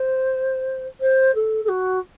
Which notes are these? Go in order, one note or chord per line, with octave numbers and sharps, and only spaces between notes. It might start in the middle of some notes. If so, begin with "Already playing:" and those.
Already playing: C5
C5
A4
A4
F#4